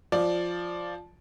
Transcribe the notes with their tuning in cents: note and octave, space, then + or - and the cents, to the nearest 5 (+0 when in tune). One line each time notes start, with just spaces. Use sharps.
F3 +0 D5 +0